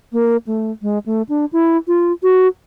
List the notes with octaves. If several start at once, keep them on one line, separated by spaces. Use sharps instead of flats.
A#3
A3
G#3
A3
D4
E4
F4
F#4